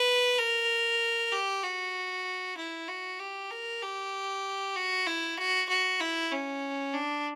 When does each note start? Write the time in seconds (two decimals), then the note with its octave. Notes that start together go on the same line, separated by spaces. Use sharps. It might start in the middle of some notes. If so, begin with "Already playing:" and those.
Already playing: B4
0.38 A#4
1.32 G4
1.63 F#4
2.57 E4
2.88 F#4
3.19 G4
3.50 A#4
3.82 G4
4.75 F#4
5.06 E4
5.37 F#4
5.69 F#4
6.00 E4
6.31 C#4
6.93 D4